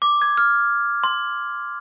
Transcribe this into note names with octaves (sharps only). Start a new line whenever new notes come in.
D6
G#6
F6
C6